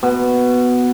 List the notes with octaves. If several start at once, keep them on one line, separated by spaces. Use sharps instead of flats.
B2